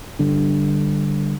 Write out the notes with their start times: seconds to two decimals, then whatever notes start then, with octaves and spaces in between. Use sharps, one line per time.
0.19 G1 G2 D3